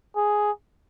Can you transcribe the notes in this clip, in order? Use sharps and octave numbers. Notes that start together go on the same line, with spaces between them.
G#4